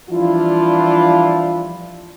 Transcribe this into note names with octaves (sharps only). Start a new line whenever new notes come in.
E3 F3 G3 D4 E4 F4